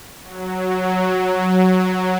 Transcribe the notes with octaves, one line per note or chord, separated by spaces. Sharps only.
F#3